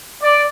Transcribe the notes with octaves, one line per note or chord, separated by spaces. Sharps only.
D5